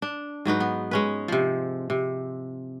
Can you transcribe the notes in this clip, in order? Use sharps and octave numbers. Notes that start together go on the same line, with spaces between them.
D4
G#2 F#3 D#4 B4
B3
G#3 C#4 B4
C3 F3
C3